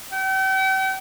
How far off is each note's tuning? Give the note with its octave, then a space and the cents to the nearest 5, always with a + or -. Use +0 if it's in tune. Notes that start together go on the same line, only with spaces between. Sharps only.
G5 -40